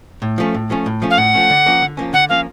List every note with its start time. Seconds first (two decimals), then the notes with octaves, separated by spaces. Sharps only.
0.22 A2
0.38 F3 A3 C#4
0.54 A2
0.70 F3 A3 C#4
0.86 A2
1.02 F3 A3 C#4
1.10 F5
1.17 A2 F#5
1.34 F3 A3 C#4
1.50 D3
1.66 F3 A#3 C#4
1.82 D3
1.97 F3 A#3 C#4
2.13 D3 F#5
2.29 F3 A#3 C#4 F5